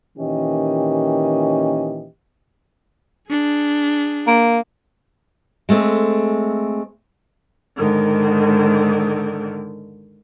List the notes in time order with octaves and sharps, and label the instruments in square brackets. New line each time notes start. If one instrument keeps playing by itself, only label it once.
[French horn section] A#2 D#3 E3 C#4 G4 D#5
[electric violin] D4 G#4
[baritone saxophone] A#3
[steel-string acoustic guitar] G#3 A3 C4 G#4
[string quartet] G#2 D3 D#3